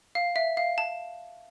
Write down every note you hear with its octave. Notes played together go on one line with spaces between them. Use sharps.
F5
E5
F5
A5